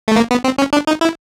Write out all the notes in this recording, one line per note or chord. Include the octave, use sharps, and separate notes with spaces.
A3
A#3
B3
C4
C#4
D4
D#4
E4